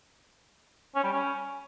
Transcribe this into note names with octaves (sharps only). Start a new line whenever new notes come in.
C#4
G3
C#4